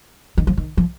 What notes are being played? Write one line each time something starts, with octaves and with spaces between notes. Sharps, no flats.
D#3
F3
D#3
F3